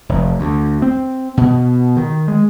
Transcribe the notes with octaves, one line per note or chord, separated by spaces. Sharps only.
F1
D2
C4
B2
D#3
G#3